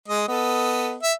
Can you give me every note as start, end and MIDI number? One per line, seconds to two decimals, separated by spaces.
0.08 0.25 56
0.08 0.25 75
0.28 0.95 59
0.28 0.95 69
0.28 0.95 75
1.02 1.13 76